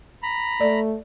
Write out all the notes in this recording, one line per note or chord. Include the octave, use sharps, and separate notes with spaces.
A#5 B5
A3 D5